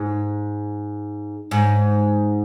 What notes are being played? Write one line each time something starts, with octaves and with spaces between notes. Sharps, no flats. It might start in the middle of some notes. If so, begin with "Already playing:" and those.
Already playing: G#2
G#2